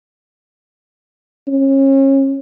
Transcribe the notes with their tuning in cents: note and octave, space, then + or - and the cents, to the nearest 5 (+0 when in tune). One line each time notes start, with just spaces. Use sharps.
C#4 -30